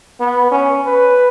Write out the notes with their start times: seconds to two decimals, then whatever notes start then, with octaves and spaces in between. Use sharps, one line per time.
0.20 B3
0.52 C#4
0.87 B4